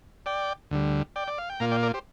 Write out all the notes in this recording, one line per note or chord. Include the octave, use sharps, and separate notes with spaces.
D5 G5
D2 D3 G3
D5 G5
D5
F5
G5
A#2 A#3 F4 F5 A#5
D5 G5
A#4 D5
G4 C5